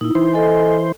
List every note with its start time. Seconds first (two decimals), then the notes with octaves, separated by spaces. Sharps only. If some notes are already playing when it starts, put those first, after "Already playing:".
0.01 A#2 D#4 E4
0.15 E3 C5
0.33 A4 D#5 G#5